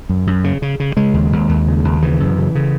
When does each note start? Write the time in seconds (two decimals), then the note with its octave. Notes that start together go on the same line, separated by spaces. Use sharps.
0.09 F#2
0.27 F#2
0.44 C#3
0.62 C#3
0.80 C#3
0.97 C#3 G#3
1.14 D#2
1.33 D#2
1.49 D#2
1.67 C#3
1.85 D#2
2.02 C#3 E3
2.20 F#2
2.38 C#3
2.55 C#3